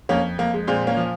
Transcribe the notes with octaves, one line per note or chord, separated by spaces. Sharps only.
F2 A#3 C#4
F2 A#3
G#3
A#2 G#3 C4
A#3 C#4
F3